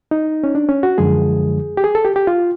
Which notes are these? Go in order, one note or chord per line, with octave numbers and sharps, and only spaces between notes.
D#4
C#4
D4
C#4
F#4
F#2 D3 F3 G#3 G#4
G4
G#4
A4
G4
G4
F4